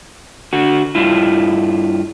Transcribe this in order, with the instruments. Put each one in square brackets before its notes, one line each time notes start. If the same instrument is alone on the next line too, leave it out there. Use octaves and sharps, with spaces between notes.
[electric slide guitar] D3 F#4
G2 E4 F4